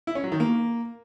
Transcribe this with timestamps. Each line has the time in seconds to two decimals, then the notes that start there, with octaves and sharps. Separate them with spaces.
0.07 E4
0.15 C#4
0.24 F#3
0.32 D#3
0.40 A#3